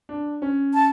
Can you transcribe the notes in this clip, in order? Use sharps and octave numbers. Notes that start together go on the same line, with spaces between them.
D4
C#4
A5